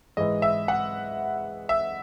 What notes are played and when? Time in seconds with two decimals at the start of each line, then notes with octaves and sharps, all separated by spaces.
0.17 G#2 E3 G#3 D#5
0.42 E5
0.68 F#5
1.69 E5